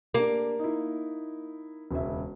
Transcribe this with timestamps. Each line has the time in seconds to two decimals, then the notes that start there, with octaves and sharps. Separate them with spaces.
0.14 A#3 D4 G4
0.59 D#4 E4
1.91 E1 C#2 E5